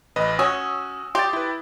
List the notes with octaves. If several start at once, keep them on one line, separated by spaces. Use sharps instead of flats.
A1 B4 D#5
C#4 F#4 D#6 E6
G4 C6 G6 A6
E4 B4